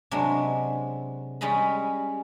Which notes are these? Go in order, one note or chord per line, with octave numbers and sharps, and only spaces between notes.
C3 F#3 G#3 D4
G3 G#3 C#4 D#5 B5